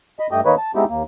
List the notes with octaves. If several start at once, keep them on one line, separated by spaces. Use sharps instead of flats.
D#5 B5
G2 A3 G4 D#5
D#3 A#3 D#4 B4 C#5
A5
G#3 B3 C4 D#4 E4 G4
D#2 A#3